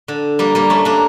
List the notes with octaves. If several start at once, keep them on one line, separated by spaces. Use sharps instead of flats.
D3
G3 A#3
G3 A#3
A3 C#4
A#3 D4